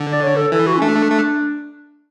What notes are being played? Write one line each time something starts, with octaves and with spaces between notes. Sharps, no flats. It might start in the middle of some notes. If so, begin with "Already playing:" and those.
Already playing: D3
D5
C#5
A4
E3 A4
F#4
C#4
A3 D4
A3